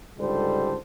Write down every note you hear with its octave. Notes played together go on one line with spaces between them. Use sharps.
C#2 G#2 D3 G3 A4 C5